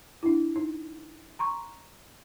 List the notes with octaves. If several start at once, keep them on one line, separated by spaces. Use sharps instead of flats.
D4 E4
D#4
A#5 C6 C#6